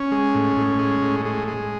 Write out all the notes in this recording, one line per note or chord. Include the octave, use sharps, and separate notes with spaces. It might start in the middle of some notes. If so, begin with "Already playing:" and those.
Already playing: C#4
G#3
A2
A2
G#3
A2
G#3
G#3